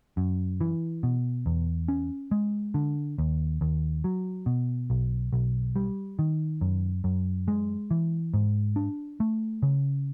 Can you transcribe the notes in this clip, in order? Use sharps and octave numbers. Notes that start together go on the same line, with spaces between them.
F#2
E3
B2
E2
C#4
G#3
D3
D#2
D#2
F#3
B2
B1
B1
G3
D#3
F#2
F#2
G#3
E3
G#2
D4
A3
C#3